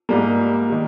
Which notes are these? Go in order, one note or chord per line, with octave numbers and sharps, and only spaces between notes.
G#2 G3 A#3
D#3 G3